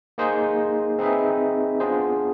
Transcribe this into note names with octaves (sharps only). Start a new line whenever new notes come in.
A#3 D#4 G#4 C5
C4 D#4 G#4 B4 E5
B3 D4 F4 G#4 C5